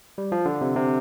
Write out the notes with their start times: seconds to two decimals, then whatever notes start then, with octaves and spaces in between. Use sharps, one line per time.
0.18 G3
0.32 F3
0.45 D3
0.61 C3
0.76 C3